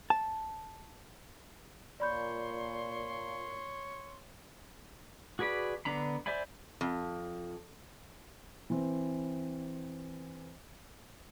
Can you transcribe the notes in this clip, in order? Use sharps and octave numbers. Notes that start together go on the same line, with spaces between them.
A5
A#2 C#5 D5 B5 C6 G6
F#4 G#4 B4 D5 B5
D3 B3 D4 A#5 B5
C5 D5 E5 G#5 B5
F2
E3 C4